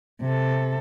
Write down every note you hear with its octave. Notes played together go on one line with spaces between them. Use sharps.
C3 A4